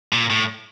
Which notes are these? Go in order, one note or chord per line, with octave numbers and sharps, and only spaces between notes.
A#2
A2